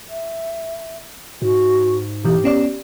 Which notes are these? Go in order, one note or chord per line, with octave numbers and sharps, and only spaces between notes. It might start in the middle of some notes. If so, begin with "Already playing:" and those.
E5
G#2 F#4
B2 E3 G4
B3 C#4 D5